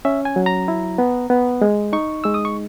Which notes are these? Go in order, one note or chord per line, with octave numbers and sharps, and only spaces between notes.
C#4 E5
G#5
F#3
A#5
E4
B3
B3
G#3
D#4 C#6
G#3 E6
D#6
C#6